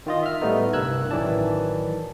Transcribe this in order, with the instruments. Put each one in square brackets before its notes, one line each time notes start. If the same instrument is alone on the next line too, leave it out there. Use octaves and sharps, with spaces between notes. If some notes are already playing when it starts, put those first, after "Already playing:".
[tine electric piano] D#3 F4 D#5
E5 F6
A2 G3 A3 B3 D#4
C2 G2 A#4 E6 F#6 G#6
A1 D#3 E3 F#3 D5 A5